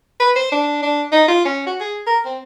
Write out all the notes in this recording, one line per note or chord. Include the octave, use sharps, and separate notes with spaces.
B4
C5
D4
D4
D#4
F4
C#4
F#4
G#4
A#4
C4